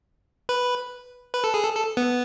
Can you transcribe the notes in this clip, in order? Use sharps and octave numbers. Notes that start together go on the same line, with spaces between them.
B4
B4
A4
G#4
A4
A4
B3